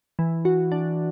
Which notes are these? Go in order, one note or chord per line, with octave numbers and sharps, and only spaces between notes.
E3
F#4
D4